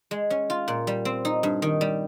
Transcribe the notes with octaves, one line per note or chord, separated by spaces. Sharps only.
G#3
C#4
F4
A#2
G3
C4
D#4
G2
D#3
G3